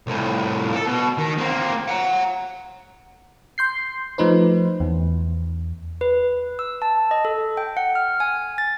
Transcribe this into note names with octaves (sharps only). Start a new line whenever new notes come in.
C2 A2
A4 A#4
B2
D#3
A#3 C4
F#5 A#5
C6 G6 C7
F3 A3 D#4 B4 C5
E2
B4
E6
A5
D#5
A4
G5
F#5
F6
G#5
A6